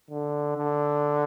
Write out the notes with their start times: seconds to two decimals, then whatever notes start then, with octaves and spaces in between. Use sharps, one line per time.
0.10 D3
0.58 D3